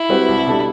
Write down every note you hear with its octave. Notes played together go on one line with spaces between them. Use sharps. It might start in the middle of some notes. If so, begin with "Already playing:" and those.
Already playing: E4
G3 C4 F#4 B4
C2
B2 G3 D4 A4